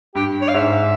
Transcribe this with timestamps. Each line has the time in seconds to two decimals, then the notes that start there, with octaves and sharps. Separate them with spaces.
0.15 G2 G4
0.41 C#5
0.48 F5
0.54 G#2 E5